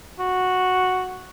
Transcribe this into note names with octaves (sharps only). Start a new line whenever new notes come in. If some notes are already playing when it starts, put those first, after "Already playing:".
F#4